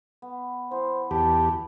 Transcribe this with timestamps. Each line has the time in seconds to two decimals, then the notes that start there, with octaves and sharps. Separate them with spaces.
0.22 B3
0.71 E3 B3 C5
1.11 E2 G4 A5 B5